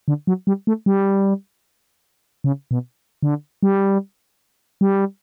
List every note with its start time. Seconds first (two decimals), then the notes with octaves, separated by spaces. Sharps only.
0.08 D3
0.27 F#3
0.47 G3
0.67 A3
0.86 G3
2.44 C#3
2.71 B2
3.23 D3
3.63 G3
4.81 G3